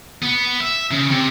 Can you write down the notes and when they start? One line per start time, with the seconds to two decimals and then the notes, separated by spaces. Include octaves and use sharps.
0.22 B3
0.61 E5
0.91 C#3
1.10 C3